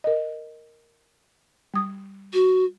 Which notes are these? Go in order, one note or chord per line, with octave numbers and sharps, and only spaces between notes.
A#4 D#5
G3 D#6
F#4